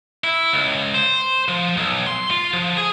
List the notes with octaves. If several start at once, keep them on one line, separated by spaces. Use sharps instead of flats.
E4
C#2
C5
F3
B1
C6
F4
F3
G#4